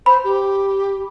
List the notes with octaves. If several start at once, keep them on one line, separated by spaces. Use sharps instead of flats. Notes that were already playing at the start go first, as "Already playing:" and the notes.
C5 B5
G4